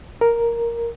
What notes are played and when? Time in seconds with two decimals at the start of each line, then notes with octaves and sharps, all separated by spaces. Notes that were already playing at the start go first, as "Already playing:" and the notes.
0.21 A#4